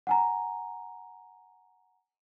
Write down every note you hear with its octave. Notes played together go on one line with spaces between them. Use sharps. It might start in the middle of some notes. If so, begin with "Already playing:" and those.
F#5 G#5 A#5